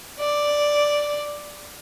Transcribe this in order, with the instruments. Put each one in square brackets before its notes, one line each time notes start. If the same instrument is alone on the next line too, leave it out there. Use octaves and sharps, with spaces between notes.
[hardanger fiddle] D5